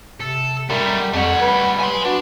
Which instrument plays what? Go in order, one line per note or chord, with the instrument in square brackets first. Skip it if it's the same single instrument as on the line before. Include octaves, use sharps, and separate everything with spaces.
[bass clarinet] C3 [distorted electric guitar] A4
[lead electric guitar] F#2 A3 [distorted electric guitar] G3 [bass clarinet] A#4
[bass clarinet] F2 [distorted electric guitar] G3 C#5 [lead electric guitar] A3 F#5
[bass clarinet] B4
[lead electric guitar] G#5 C6
[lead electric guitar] D4 [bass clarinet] F#4